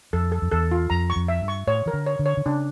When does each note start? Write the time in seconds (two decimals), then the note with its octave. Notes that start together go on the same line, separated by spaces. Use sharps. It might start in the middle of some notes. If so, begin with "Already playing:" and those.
0.13 F2 A4
0.32 A4
0.42 F2
0.51 E2 A4
0.72 F4
0.90 F2 A#5
1.10 C#6
1.16 F2
1.28 E5
1.42 G2
1.48 C#6
1.67 A2 C#5
1.86 E3 A#4
1.93 D3
2.06 C#5
2.19 D3
2.26 C#5
2.37 D3
2.46 C#3 D4